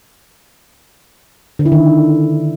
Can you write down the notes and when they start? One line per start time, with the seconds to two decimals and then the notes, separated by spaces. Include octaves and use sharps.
1.59 D3
1.66 E4
1.72 D#3